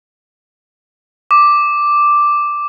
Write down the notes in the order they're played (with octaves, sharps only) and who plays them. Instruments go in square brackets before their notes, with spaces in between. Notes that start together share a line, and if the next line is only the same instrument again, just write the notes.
[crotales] D6